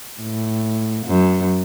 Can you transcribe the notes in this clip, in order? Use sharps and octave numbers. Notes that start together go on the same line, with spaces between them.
A2
F#2